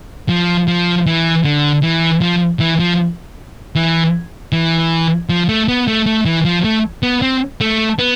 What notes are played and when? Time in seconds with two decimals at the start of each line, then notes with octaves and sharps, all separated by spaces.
0.29 F3
0.68 F3
1.06 E3
1.44 D3
1.83 E3
2.22 F3
2.60 E3
2.79 F3
3.75 E3
4.52 E3
5.29 F3
5.49 A3
5.68 B3
5.88 A3
6.06 A3
6.25 E3
6.45 F3
6.64 A3
7.03 B3
7.22 C4
7.61 A3
7.99 B3